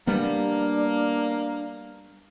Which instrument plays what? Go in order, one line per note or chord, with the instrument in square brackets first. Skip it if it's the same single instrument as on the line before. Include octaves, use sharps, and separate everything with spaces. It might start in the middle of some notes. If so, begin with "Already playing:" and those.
[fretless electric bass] G3 B3 [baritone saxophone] A#3 [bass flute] D4